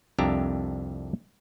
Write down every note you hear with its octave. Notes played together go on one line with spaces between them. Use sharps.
C2 F2 D4 G4 E5 A#5